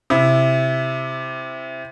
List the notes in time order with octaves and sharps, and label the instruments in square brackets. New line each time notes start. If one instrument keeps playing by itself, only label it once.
[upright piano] C3 E4